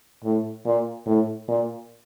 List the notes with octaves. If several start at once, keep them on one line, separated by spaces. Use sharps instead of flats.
A2
A#2
A2
A#2